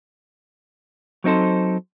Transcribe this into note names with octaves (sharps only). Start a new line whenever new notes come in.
F#3 C4 D#4 A4 C5